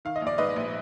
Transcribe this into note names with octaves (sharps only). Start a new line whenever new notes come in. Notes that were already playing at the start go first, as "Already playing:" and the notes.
D#3 F5
D#5
A#1 D5
G#2 B4 D#5
A#1